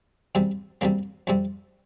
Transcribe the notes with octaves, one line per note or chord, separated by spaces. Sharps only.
E2 C3 G3
E2 C3 G3 A#3
F2 C3 G3